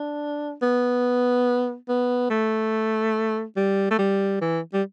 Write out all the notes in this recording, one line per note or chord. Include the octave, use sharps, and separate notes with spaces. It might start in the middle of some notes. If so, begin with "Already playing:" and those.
Already playing: D4
B3
B3
A3
G3
A3
G3
E3
G3